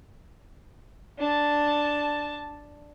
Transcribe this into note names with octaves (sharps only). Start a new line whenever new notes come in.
D4 A5